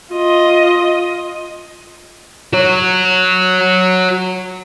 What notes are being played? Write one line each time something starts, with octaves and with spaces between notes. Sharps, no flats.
F4 D#5
F#4 C#5